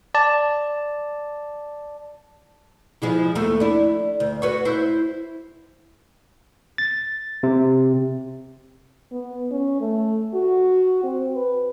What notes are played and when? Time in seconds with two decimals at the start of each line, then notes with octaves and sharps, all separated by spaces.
0.15 D5 A5
3.02 F3 G#3 E4
3.35 D#2 A3
3.60 D4 E4
4.20 D2
4.42 F#4 B4 C#5
4.65 E4 C5
6.78 A6
7.43 C3
9.12 B3
9.51 C#4
9.81 A3
10.34 F#4
11.04 C4
11.36 B4